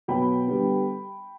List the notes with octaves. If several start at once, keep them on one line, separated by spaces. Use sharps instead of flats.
B2 F#3 B3 G5 B5
D3 G3 B3